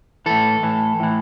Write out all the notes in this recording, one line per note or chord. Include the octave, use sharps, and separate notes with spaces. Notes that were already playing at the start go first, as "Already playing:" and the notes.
A2 E3 A4
A2 E3
A2 E3